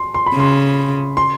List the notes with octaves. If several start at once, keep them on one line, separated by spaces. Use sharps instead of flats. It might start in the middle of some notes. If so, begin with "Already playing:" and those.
Already playing: C6
C6
B5
C#3
C6
C6